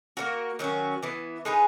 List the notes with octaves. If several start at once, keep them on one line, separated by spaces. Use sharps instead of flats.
A#3 C#4 F#4 A#4
D#3 F#3 C#4 F#4
E3 B3 E4
G#3 D#4 G#4 B4